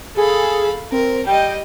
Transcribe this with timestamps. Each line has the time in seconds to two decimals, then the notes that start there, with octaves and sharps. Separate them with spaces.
0.17 G#4 A4 F5 B5
0.92 C4 A#4
1.27 G3 D#5 G5